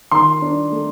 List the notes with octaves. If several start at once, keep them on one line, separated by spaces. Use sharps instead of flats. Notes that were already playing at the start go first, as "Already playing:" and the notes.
D#3 C6
D4
A3